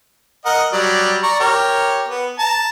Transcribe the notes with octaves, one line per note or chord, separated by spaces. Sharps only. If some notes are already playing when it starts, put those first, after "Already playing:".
A#4 D#5 F#5
F#3 G3 D5
D5 A#5 C#6
G4 A#4 C#5
B3
A5 A#5